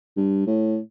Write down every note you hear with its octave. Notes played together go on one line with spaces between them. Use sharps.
G2
A2